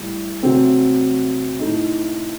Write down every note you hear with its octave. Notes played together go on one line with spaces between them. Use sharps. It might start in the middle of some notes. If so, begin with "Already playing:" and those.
Already playing: A2 G3
C3 F#3 A3 C4
A2 A3 D#4